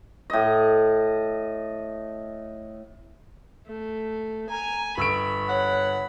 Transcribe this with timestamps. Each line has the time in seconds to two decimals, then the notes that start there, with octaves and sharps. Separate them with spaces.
0.30 A2 D#5
3.67 A3
4.49 G#5 A#5
4.97 G1 B5 C#6 E6 D7
5.49 C#5 F#5